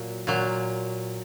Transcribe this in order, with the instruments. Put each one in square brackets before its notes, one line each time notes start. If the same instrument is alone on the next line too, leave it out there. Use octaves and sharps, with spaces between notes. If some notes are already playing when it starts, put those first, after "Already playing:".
Already playing: [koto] A#2 F#3
A#2 F#3